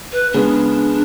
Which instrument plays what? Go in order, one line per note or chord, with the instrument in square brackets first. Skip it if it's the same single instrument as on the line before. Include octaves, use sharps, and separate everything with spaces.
[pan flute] B4
[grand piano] C#3 G#3 B3 [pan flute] D4